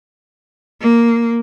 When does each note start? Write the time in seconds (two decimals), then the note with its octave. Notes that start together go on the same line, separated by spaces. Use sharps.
0.81 A#3